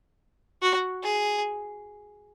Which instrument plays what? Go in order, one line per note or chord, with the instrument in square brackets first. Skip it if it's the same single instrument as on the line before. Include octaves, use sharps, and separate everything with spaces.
[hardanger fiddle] F#4
G#4